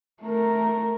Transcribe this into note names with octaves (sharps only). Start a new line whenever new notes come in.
A3 A#4